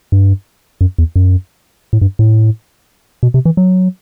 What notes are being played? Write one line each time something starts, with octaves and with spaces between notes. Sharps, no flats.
G2
F#2
E2
F#2
A2
G2
A2
B2
C3
E3
F#3